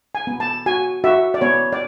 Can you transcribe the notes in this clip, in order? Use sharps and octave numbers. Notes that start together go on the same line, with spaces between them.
G#5
B3
A5
F#4 G#5
F#4 E5
D5
B3 C#5
D5